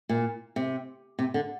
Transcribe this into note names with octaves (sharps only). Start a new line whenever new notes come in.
A#2
C3
C3
D3